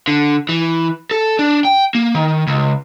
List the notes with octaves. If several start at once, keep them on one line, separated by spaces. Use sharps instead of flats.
D3
E3
A4
D4
G5
A#3
D#3
C#2